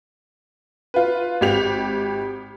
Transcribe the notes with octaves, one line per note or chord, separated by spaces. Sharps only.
F4 B4
G#1 G4 F7